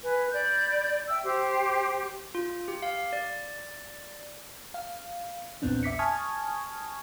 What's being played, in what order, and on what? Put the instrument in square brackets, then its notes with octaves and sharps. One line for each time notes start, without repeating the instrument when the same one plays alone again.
[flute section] B4 G#5
D5 B5 G6
E5 G5 E6
G4 C5
[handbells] F4
G4
F5
D5
[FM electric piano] F5
A#1 E2 A#2 B3 C4 D4
E5 D6 B6 C#7
G#5 A5 C#6 D#6 F6 G#6